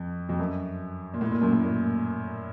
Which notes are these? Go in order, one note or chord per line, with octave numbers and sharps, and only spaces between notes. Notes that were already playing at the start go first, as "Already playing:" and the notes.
Already playing: F2
F2
F#2
A#2
A2
A#2
F#2
A2
A#2